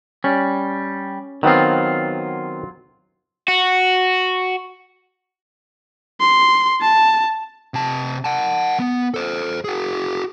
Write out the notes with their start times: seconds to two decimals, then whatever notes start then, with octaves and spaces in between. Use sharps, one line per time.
0.24 G3 C#4
1.43 D#3 F#3 B3 C4 F4
3.48 F#4
6.20 C6
6.81 A5
7.74 C3 A5
8.24 F#5 A5
8.79 B3
9.14 A4 C5
9.64 F#4 G#4